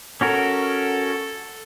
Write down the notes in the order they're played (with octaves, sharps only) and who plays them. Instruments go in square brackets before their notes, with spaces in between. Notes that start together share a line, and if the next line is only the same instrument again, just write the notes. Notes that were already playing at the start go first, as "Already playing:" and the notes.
[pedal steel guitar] C#4 F#4 A#4 [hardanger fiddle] A4